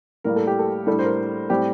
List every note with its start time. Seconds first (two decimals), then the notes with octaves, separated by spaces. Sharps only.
0.24 A2 G3 A#3 A#4
0.36 A4
0.47 G4
0.59 A4
0.87 A2 G3 D4 A4
0.99 C5
1.04 A#4
1.50 A2 G3 C4 G4